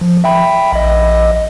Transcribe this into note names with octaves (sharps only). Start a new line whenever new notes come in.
F3
E5 G5 B5
A#1 D#5